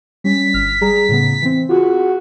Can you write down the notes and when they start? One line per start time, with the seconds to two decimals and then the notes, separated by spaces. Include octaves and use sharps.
0.24 G3 C#4 B6
0.54 G1 F6
0.81 G3 G#4 A#5
1.09 A2 C#3 B3
1.42 E3 C4
1.69 F4 F#4 G#4